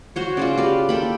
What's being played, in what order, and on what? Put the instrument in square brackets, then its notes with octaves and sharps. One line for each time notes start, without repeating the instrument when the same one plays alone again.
[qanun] F#4 C5 C#5
[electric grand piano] C#3 C#4 F#4 [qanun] F4 C5 D5
[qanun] G4 B4 D5
[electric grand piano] A#3 [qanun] A4 G5 B5